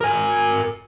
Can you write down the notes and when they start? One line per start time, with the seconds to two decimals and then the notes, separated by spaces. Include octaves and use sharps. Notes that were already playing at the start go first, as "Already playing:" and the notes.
0.01 A#4 G#5